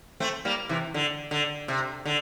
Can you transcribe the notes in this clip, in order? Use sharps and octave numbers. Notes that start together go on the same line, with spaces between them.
A3 C4
G3 A#3
C3 E3
D3
D3
C3
D3